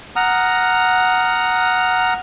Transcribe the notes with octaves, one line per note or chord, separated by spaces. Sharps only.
F#5 A#5 D#6 F6